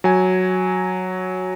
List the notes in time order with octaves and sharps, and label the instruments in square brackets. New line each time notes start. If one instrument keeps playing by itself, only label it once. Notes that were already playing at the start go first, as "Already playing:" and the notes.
[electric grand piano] F#3 G#5